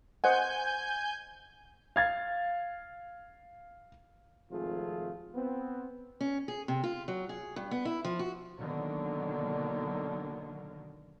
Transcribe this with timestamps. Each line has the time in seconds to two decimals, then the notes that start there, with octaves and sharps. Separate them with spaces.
0.24 C5 D#5 F#5 G#5 G6
1.96 F5 G#6 A6
4.51 G#1 C3 F3 A3 F4 G#4
5.35 B3 C4
6.21 C#4
6.48 G#4
6.68 C3
6.84 F4
7.08 F#3
7.29 G#4
7.56 G2
7.71 B3
7.85 E4
8.05 F3
8.19 F#4
8.60 B2 D3 D#3 F#3 A#3